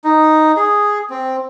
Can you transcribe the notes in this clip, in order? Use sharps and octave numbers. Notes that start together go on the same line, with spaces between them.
D#4
G#4
C4